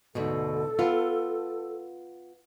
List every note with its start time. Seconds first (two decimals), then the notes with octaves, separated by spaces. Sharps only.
0.15 D2 G#2 B2 A4
0.79 B3 F4